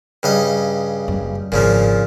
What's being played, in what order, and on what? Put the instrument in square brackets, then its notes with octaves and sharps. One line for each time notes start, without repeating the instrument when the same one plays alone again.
[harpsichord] G2 C#3 D#5
[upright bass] F#1 F#2
[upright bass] G#1 [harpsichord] A#2 C#3 F3